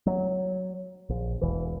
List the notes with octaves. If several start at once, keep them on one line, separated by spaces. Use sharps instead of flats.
F#3
A#1
E1 E3